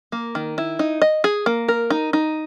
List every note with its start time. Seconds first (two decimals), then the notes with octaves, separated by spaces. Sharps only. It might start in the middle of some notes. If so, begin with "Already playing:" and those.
0.12 A#3
0.35 D#3
0.58 E4
0.79 D#4
1.02 D#5
1.24 G#4
1.46 A#3
1.68 A#4
1.90 D#4
2.13 D#4